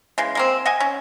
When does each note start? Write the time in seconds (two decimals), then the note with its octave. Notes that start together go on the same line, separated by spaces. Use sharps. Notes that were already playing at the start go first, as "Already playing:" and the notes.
0.18 C#3 E3 G#3
0.35 G#3 A#3 C4
0.66 D#5 F#5 G#5
0.80 C#4